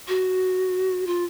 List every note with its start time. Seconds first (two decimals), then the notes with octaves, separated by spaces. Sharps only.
0.08 F#4
1.07 F4